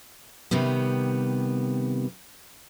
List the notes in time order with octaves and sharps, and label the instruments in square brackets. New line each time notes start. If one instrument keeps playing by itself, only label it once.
[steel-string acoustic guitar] C3 D#3 G3 B3